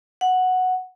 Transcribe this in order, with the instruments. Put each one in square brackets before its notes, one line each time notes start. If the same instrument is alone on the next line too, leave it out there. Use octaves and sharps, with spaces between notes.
[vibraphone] F#5